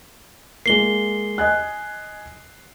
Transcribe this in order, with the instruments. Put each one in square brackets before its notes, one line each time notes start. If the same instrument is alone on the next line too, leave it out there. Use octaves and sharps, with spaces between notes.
[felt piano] G#3 A#3 [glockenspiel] C7 G7
[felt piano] D#5 G#5 F#6